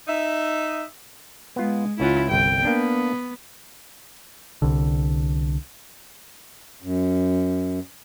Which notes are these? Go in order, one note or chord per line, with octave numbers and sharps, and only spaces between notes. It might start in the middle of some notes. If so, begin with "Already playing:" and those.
D#4 E5
G#3 B3 F4
C#2 C#4 E4 F4 F#5
G1 C2 G5
A#3 B3 D4
C2 D3
F#2